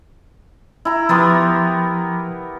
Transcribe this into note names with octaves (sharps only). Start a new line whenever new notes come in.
E4 A#5
F3 B3 G4 A#4 C6 D#6